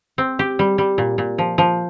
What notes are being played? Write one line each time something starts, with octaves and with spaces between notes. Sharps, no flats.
C4
G4
G3
G3
A#2
A#2
F3
F3